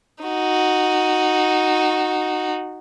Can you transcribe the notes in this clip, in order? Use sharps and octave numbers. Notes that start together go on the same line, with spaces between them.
D#4 F#4